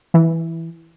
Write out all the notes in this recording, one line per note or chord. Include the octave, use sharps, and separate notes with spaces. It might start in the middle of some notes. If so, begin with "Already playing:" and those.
E3